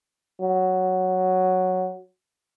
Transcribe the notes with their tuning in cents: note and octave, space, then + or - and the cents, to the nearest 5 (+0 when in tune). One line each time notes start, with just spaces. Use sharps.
F#3 +0